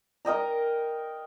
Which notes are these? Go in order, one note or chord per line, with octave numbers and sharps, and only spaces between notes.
A#4 D#5 G5 A#5